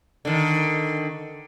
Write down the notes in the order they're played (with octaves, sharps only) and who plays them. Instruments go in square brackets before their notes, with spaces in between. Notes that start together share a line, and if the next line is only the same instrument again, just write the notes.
[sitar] D3 D#3